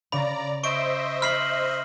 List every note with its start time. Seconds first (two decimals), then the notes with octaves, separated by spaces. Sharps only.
0.12 C#3 D5 A#5 B5
0.63 C5 D#5 E5 C#6 D7
1.22 B5 F6 B6 C7 F#7